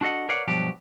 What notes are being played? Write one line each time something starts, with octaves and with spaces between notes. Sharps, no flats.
D4 F#4 A4 D#5 F#5
A#4 B4 C#5 D5 F5 F#5
G2 B2 F3 F#3 G4